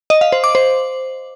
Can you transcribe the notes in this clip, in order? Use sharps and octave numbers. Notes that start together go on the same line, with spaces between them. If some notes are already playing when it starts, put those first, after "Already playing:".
D#5
F5
C5
D6
C5